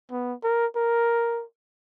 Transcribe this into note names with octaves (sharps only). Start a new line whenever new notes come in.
B3
A#4
A#4